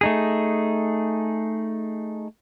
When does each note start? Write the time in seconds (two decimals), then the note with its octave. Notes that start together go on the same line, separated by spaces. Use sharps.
0.01 A3 D#4 G#4